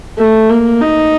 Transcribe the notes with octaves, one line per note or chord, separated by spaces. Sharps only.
A3
A#3
D#4